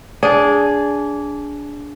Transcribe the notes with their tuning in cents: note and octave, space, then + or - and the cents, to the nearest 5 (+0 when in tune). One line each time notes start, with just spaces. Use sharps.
D4 -20 G#4 +0